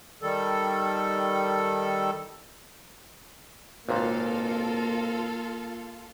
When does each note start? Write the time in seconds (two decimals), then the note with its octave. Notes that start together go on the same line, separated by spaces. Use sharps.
0.23 D#3 G3 A4
3.89 G#1 C#2 A#2 A#3 F4 A4 F5